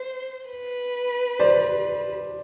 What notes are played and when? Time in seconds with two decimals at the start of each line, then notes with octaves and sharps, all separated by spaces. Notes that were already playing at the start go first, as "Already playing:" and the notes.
Already playing: C5
0.49 B4
1.39 C5 D5